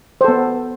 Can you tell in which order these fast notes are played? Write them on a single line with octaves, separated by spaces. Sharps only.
C5 A4 B3